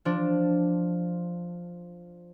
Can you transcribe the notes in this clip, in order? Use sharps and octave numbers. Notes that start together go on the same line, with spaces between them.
F3 D4